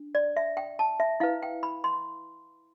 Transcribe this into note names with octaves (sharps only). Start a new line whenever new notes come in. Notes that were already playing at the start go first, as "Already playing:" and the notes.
Already playing: D4
D5
E5
G5
A5
E5
E4 B4 F5
G5
B5
C6